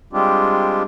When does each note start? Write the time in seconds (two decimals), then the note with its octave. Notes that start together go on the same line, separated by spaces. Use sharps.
0.13 G3 G#3 C4 D4 F4 G4